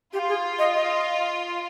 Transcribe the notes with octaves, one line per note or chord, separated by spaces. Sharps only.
F4 G4
G#4
D#5
D#5